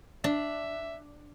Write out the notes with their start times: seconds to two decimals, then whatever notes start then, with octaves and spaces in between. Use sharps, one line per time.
0.24 D4 E5